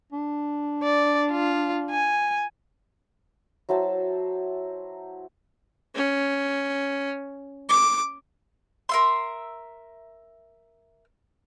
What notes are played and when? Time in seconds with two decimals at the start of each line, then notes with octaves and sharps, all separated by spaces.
0.12 D4
0.83 D5
1.31 F4
1.90 G#5
3.69 F#3 E4 C5 A5
5.96 C#4
7.69 D6
8.89 A#4 E5 C6